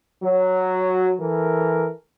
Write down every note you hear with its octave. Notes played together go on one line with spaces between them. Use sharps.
F#3
E3 A4 A#4